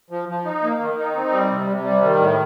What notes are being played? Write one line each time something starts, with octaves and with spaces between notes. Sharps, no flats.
F3
F3
D#4
A#3
D#3
D#4
C4
G3
C3
C3
G3
D#3
A2